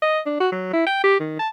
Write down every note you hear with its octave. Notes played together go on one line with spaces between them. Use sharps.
D#5
D4
F#4
F#3
E4
G5
G4
D#3
A5